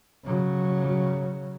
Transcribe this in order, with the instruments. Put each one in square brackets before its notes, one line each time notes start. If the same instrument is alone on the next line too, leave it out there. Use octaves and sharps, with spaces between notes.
[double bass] C#3 F#3